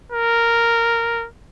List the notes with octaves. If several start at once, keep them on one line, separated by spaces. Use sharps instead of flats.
A#4